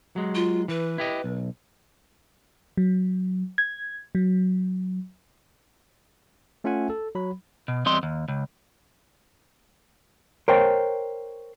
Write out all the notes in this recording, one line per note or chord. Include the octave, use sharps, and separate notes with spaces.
F#3 G#3
F4
E3 B4
E4 G4 D#5
B1
F#3
G#6
F#3
A3 C#4 F4 E5 F#5 G#5
A4
F#3 B5
B2
E2 G3 C4 D#5 C6
D#2
C#2
A#4 C5 C#5 G5